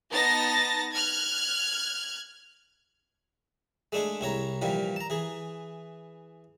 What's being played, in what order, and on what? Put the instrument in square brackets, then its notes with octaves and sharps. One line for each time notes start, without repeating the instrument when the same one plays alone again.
[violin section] B3 D#4 A5 A6 A#6
F6 F#6 G#6
[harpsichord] G#3 A3 D4 G#4 A4
C2 E4 C#5 A#5
A#2 E3 F3 G3
A5 A#5
E3 G#4